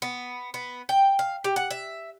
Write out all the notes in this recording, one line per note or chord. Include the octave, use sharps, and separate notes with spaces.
B3
B3
G5
F5
G4
F#5
E5